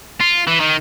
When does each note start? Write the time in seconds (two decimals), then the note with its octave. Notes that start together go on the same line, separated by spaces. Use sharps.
0.20 F4
0.47 E3
0.60 D#3